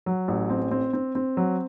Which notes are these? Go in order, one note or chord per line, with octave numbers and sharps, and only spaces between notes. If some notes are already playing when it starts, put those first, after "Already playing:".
F#3
A1
C4
C4
C4
C4
F#3